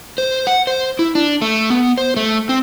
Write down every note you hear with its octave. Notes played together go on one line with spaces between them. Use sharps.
C5
F#5
C5
E4
D4
A3
B3
C5
A3
C4